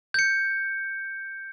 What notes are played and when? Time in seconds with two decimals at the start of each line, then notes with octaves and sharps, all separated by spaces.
0.14 G6 C#7